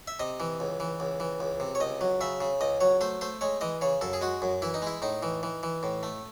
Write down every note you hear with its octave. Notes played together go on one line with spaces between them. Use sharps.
E5
C3 D#5
E3
C#2
E3
C#2
E3
C#2
C3
C#5
C#2 D#5
F#3
C#3 E5
C#3
C#2 D#5
F#3 C#5
A3 C5
A3 C5
G#3 C#5
E3 D#5
C#3 C#5
F#2 A4
G#4
G#3 F#4
F#2
E3 E4
D#4
G#3 E4
A2 D#4
E3
E3
E3
A2
A3